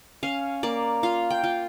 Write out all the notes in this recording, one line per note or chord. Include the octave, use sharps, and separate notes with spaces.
C#4 F5
A#3 D5
F4 F5
G5
F4